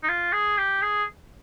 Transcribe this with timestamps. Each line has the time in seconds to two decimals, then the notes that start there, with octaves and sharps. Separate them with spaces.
0.03 D#4
0.09 F4
0.33 G#4
0.58 G4
0.82 G#4